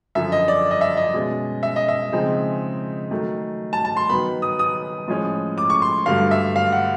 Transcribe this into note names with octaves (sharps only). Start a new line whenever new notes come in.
F#2 D3 F3 E5
D#5
D5
D#5
E5
D#5
B2 G#3 C#4
E5
D#5
E5
C#3 F3 G#3 C4 D#4
D#3 F#3 A3
A5
A5
C6
D#3 F#3 B3 B5
D#6
D#6
A2 F3 G#3 C#4
D6
C#6
C6
G2 D3 F#3 A3 F5
E5
F5
F#5